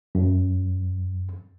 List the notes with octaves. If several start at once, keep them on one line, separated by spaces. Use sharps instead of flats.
F#2